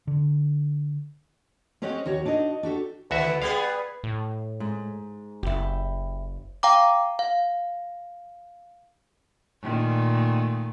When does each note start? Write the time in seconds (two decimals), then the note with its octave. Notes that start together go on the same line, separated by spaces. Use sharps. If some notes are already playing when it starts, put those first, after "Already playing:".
0.07 D3
1.82 C4 C#4 G4 C#5 D#5 F#5
2.05 D#2 F#4 G4 C#5
2.25 D4 D#4 F#4 D5 D#5
2.63 D4 F#4 G4 A4
3.11 D2 B2 D#3 F#4 B4 E5
3.42 G3 B3 G#4 B4 F5
4.04 A2
4.60 G#2
5.43 F#1 E4 G4
6.63 F5 G5 A#5 D6
7.19 F5
9.62 A#2 D#3 A3